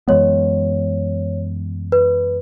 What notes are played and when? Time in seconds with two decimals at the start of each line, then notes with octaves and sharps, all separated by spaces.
0.08 F#2 E3 G#3 B3 C#5
1.92 B4